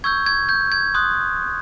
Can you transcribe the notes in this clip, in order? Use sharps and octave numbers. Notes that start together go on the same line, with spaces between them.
C#6 E6 G6 G#6
G#6
G6
G#6
C6 D#6 F#6